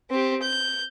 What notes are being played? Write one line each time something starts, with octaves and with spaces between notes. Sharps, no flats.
C4 G4
G6